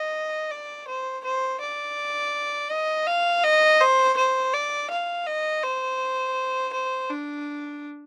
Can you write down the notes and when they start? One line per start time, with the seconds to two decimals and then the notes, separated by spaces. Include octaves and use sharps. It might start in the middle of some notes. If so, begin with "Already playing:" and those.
Already playing: D#5
0.51 D5
0.88 C5
1.24 C5
1.61 D5
2.71 D#5
3.07 F5
3.44 D#5
3.81 C5
4.17 C5
4.54 D5
4.90 F5
5.27 D#5
5.63 C5
6.73 C5
7.10 D4